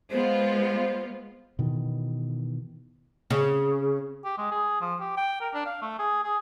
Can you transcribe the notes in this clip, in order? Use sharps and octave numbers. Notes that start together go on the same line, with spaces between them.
G#3 B3 F4 C5
B2 D#3 E3
C#3
G4
G#3
G#4
F3
G4
G5
A#4
D4
F5
A3
G#4
G#4